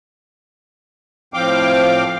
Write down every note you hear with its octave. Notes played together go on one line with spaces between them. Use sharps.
A2 F3 C4 F5 G5 D6